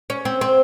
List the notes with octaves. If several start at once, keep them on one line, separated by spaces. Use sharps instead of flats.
C#4
C4
C4